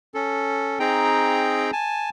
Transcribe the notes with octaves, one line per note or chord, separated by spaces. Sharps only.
C#4 A4
C4 D#4 G#4 G5 A#5
G#5 A5